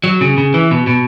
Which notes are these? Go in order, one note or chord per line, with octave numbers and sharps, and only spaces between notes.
F#3
C#3
C#3
E3
B2
B2